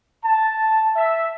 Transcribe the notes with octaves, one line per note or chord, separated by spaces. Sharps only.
A5
E5